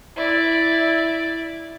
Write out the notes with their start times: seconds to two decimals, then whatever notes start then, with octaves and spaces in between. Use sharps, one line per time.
0.16 E4 D5